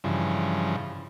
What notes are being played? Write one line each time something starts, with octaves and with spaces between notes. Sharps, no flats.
G2 C#3 E3 F3